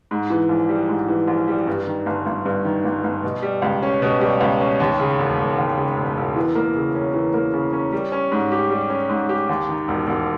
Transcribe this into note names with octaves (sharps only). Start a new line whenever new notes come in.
G#2
E3
A#1
G3
G#2
E3
A#1
G3
G2
D#3
G1
G1
G2
D#3
G1
G1
B2
G3
C#2
C#4
B2
G3
C#2
C#4
D#2
C#3
E1
E1
D#2
C#3
E1
E1
E3
A#3
C#3
C#4
E3
A#3
C#3
C#4
G3
C#4
G#2
G4
G3
C#4
G#2
G4
D#2
D#3
E1
E1